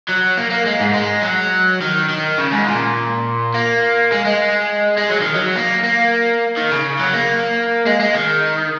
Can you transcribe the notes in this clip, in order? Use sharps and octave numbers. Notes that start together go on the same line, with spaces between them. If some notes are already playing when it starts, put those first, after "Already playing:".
F#3
A#3
A#3
G#3
G#2
G#3
F#3
D#3
D#3
C#3
G#2
A#2
A#3
G#3
G#3
G#3
F#3
D#3
F#3
A#3
A#3
D#3
C#3
F#3
A#3
G#3
G#3
D#3